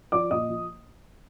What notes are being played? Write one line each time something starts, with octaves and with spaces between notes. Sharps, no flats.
F3 D5 D6
A#2 D#5 D#6
F3